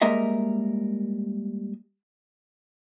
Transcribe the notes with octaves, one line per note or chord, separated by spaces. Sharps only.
G3 G#3 A#3 A#4 D#5 E5